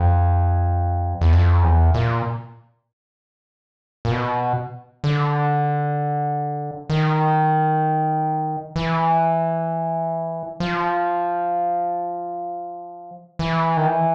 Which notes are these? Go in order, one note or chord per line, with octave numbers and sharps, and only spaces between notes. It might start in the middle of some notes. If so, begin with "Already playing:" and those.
Already playing: F2
E2
F2
E2
A#2
A#2
B2
D3
D#3
E3
F3
E3
D#3
E3